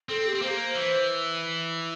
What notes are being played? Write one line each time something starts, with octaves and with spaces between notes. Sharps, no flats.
C4 A4
G4
C4
A#3 C5
E3